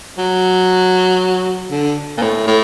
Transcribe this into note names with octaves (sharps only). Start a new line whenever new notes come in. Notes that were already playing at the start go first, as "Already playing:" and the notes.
F#3
D3
A#2
A2
A2